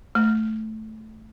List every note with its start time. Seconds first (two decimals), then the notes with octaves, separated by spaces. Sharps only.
0.15 A3